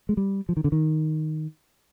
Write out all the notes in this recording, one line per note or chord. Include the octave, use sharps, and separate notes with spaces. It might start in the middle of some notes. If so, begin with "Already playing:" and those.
G#3
G3
F3
D#3
D3
D#3